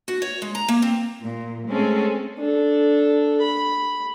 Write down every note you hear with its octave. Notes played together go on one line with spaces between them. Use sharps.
F#4
C#5
G#3
A#5
A#3
C4
A#2
G#3 A3 C4 C#4 G#4 A4
D4 A4
B5